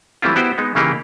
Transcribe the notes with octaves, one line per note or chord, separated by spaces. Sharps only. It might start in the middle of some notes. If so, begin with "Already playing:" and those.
E3 G3 A3 C4 E4 F4
B3 E4 F#4 G4 C5 G5
G#3 B3 D#4
C#3 E3 A#3 D#4 G4 G#4